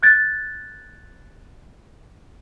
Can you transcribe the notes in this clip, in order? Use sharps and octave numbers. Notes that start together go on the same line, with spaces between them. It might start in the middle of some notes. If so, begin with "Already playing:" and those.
F#6 G#6 A6